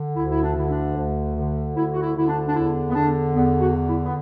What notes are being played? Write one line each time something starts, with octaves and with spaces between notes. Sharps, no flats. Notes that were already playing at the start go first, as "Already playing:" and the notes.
Already playing: D3
D2 E4
E4
D4
D3 E4
D4
D2
D3
D2 E4
F#4
E4
D3 E4
D4
D4
E2 E4
B3
D3 D4
E2 B3
F#4
D3
E4
B3